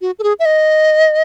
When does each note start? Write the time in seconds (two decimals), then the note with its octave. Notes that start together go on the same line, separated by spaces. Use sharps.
0.01 F#4
0.19 A4
0.23 G#4
0.39 E5
0.45 D#5